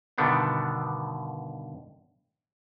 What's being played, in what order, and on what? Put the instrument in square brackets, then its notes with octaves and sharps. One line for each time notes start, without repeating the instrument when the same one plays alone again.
[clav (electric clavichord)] G2 B2 D3 D#3 B3 D4